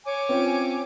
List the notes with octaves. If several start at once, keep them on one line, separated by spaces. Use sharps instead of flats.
C#5 G#5 D6
C4 C#4 F4